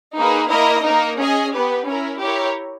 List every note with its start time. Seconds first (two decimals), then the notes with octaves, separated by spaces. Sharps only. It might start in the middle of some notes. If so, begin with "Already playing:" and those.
0.17 A#3 D#4 G#4 B4
0.50 A#3 E4 A#4 D#5
0.85 A#3 D#4 A#4
1.18 C#4 G#4 D#5 G#5
1.53 B3 G4 B4
1.86 C#4 E4 A#4
2.20 E4 G4 A#4 C#5